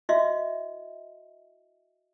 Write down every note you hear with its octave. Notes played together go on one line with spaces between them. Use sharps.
E4 F#4 D#5 E5